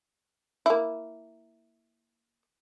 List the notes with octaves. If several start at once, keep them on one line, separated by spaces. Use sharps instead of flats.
A#3 E4